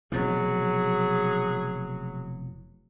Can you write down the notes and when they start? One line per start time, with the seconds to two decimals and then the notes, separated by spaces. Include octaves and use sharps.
0.12 F1 B2 E3 F#3 G#4